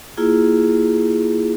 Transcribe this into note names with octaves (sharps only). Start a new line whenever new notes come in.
A#3 E4 F4 G#4